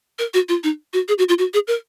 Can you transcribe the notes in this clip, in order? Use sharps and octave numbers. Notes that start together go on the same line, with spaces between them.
A#4
F#4
F4
D#4
F#4
G#4
F#4
F4
F#4
G#4
A#4